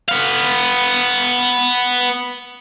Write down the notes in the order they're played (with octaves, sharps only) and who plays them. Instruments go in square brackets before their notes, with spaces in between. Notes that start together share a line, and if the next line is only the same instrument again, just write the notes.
[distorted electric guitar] B3 F5